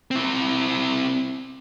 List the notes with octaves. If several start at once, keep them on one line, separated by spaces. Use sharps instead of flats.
C4 E4